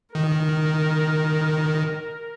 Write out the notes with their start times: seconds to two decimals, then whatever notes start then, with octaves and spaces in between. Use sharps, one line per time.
0.15 D#3 A#4